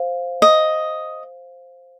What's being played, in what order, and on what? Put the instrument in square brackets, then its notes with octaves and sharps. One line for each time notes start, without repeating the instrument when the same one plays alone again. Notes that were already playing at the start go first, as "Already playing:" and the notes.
Already playing: [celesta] C5 F5
[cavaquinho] D#5